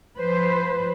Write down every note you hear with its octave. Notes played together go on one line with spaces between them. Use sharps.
F3 B4 C5